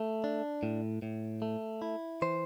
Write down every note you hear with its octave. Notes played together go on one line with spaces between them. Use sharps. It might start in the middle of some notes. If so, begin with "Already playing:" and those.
Already playing: A3
D4
A2
A2
A3
E4
E3 C5